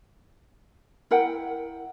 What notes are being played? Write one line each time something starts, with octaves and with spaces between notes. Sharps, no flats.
E4 A#4 F#5 G5